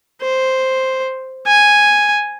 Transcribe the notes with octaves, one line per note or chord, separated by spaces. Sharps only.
C5
G#5